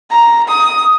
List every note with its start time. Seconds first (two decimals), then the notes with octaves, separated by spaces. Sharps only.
0.10 A#5
0.47 D#6